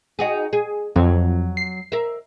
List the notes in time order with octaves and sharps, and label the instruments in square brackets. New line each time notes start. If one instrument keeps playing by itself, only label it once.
[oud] D#4 F#4 G#4
G#4
[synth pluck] F2 [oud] F#3
[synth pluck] C7
[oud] A#4 E5